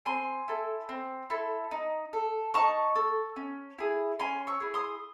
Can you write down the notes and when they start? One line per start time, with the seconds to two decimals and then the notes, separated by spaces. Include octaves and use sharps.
0.05 C4 G#5 C6
0.48 E4 A4
0.89 C4
1.30 E4 A4
1.71 D#4
2.13 A4
2.54 D#4 A5 C#6
2.95 A4
3.36 C#4
3.79 E4 G#4
4.19 C#4 G#5 C6
4.47 C#6 E6
4.60 E4 G#4
4.74 C6 D#6